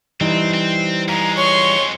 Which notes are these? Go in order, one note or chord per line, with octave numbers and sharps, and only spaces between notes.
E3 G3 C4 D#4
C4
F2 G#3 A#5
C#5 C6 C#6